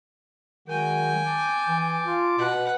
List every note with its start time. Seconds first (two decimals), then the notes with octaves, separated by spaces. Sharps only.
0.68 D#3 F#3 G#3 F#4 G5 G#5
1.25 A5 D6
1.67 E3
2.06 F4
2.38 B2 B4 F#5